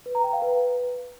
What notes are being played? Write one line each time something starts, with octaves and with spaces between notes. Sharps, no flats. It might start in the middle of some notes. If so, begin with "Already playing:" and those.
B4
A#5
G5
F5
B4